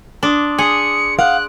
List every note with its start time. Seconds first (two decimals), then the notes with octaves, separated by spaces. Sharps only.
0.23 D4 C6 D6 D#6
0.59 G#4 C6 C#7
1.19 F5 F#5 F#6 D7